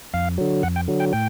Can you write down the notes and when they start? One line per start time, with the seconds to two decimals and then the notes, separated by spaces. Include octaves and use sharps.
0.14 F2 F5
0.38 D3 F#3
0.63 F2 F#5
0.76 G5
0.88 D3 F#3
1.00 G5
1.13 A2 G5